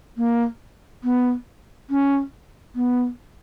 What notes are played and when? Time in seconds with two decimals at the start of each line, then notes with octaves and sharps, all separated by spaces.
0.17 A#3
1.04 B3
1.90 C#4
2.76 B3